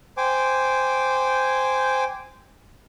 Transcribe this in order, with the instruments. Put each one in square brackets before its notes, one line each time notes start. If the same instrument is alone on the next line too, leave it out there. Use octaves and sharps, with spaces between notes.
[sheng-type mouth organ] C5 G5 G#5 D6